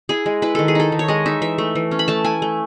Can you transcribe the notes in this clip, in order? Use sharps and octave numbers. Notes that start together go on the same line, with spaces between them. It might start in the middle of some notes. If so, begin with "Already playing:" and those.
E4 G#4
G#3
E4 B4
D#3 A4
G#4
D#4 A4
D#3
C#5
G#3 D#5
D#4 E5
E3 E5
A3
E3
C#4
B5
A3 A5
E4 G#5
A3